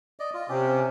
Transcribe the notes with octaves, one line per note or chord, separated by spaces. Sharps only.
D5 D#5
F4
C3 C#4 G4